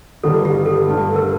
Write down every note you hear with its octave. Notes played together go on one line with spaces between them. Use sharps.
G1 G2 D#3 G3 A4
G4
A4
G2 D3 A3
A#4